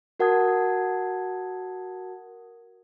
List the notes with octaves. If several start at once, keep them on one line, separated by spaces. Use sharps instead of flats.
F#4 A#4 F#5 A5 D#6 G#6